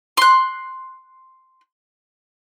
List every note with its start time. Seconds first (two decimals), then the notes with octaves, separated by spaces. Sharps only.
0.17 C6 F#6